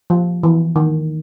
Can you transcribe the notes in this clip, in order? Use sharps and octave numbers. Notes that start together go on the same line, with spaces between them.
F3
E3
D#3